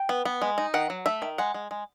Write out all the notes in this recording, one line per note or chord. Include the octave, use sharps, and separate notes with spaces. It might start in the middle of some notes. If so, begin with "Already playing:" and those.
Already playing: G5
B3
B3
G#3
D#4
D#3 F#5
F#3
A3 E5
D#3
G#3 F#5
G#3
G#3